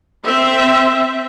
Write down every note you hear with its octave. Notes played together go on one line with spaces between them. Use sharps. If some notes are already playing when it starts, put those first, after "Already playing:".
C4 C5 E5